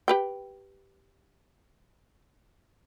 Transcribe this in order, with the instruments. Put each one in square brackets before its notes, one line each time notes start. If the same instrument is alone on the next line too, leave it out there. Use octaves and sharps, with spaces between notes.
[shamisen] G4 B4 G5